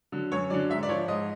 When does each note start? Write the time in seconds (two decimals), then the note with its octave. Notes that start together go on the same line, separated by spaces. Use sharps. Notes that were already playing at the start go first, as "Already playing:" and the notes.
0.12 D3 F#3
0.32 F#2 C#5
0.50 D3 F#3 D5
0.69 G#2 E5
0.83 D5
0.89 F3 C#5
1.08 G#2 D#5